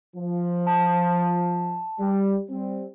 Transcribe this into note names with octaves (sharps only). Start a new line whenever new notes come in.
F3
A5
G3
G3 C4